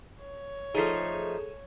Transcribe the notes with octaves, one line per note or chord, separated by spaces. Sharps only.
C#5
F3 A3 D#4 G#4 A4